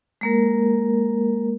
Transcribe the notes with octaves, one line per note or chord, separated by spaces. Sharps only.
G#3 A#3 A#4